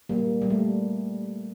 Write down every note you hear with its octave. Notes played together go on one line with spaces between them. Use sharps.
G3 A#3
G3
A3